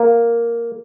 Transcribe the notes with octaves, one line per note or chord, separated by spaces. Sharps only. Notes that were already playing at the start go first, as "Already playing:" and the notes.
Already playing: A#3